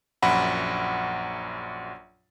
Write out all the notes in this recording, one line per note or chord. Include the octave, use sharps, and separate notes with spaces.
A#1 F#2 F#5 B5